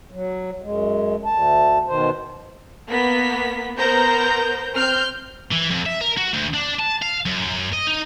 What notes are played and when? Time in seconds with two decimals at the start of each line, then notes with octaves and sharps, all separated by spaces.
0.11 F#3
0.62 F#2 G#3
1.25 D2 A5
1.87 B2 D#3 C5
2.88 A#3 B3 B6
3.76 B3 A#4 C5 A#5 G6
4.76 C4 F6 G6
5.52 E3
5.70 F2
5.86 E5
6.01 A#4
6.17 F#4
6.33 D2
6.53 D4
6.79 A5
7.02 F5
7.26 F#2
7.73 D#5
7.87 D#4